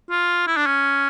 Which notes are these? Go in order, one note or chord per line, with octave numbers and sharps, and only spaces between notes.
F4
E4
D4
C#4